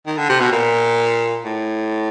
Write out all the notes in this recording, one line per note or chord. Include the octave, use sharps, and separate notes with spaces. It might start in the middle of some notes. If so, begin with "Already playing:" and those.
D#3
D3
C3
B2
A#2
A2